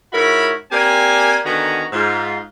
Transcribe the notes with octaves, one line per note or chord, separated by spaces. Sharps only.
G#2 E4 F#4 A#4 C#5 B5
A#3 C4 G4 D5 G#5
D3 D#3 B3 F#4 G#5 A#5
G#2 F4